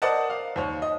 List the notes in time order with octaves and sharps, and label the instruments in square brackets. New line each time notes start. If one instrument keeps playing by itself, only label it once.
[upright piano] A#4 C5 D5 D#5 F#5 A5
F5
D#2 C5 C#5
D#5